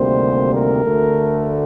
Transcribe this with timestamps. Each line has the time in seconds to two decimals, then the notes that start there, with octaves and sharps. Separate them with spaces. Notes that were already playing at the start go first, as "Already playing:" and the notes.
Already playing: D2 C3 D#3 G3 A#3 C5
0.54 A#4
0.85 D2 D3 A3